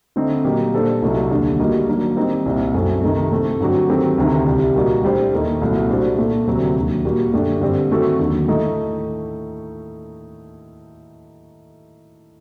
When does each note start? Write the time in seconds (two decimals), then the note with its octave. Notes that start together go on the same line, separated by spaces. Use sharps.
0.16 D3 A3 C4 D#4
0.44 A#2 F#3 A#3 D#4 G4
0.73 A#2 G3 D4 A4 C5
1.02 C2 C3 F#3 A3 D#4
1.31 D#2 D3 G3 D4
1.60 A2 G3 A#3 D#4 F#4
1.88 D#3 F#3 A#3 D4
2.17 D#3 G3 C4 D#4
2.46 C2 A#2 G3 C4 D#4
2.74 F#2 F#3 A3 C4
3.03 C3 D#3 A3 D#4
3.32 A2 A3 C4
3.60 G2 D3 F#3 C4 F#4
3.89 D#3 F#3 A3 C4 G4
4.18 D2 C3 D#3
4.46 C2 C3 G3
4.75 A#2 G3 A#3 D#4 F#4
5.04 A2 G3 D4 G4 C5
5.33 D#2 D#3 A3 D#4
5.62 C2 A#2 F#3 A3
5.90 A2 G3 D4 F#4 C5
6.18 A#2 A3 D4
6.47 D2 C3 F#3 C4
6.76 D#2 D3 F#3
7.05 A#2 G3 A#3 F#4
7.33 F#2 D3 A3 D4 G4
7.61 G2 D3 G3 C4
7.90 D#3 A3 C4 F#4 A4
8.19 D#2 D3 F#3
8.48 A2 A3 D#4